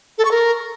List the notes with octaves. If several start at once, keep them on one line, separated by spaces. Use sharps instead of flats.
A4
C#6
A#4